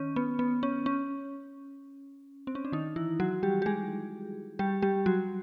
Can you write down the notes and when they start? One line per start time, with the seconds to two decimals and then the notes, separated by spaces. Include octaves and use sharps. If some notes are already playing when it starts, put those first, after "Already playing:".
Already playing: D#3 C#4
0.16 B3
0.39 B3
0.63 C#4
0.86 C#4
2.47 C4
2.55 C#4
2.65 D4
2.72 D#3 D#4
2.96 E3 E4
3.20 F#3 F#4
3.43 G3 G4
3.62 G4
3.66 G#3 G#4
4.59 G3 G4
4.82 G3 G4
5.06 F#3 F#4